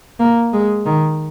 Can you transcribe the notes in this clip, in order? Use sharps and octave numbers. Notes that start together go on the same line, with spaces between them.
A#3
G#3
D#3